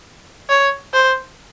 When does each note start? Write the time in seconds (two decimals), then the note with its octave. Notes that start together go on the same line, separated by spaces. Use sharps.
0.50 C#5
0.94 C5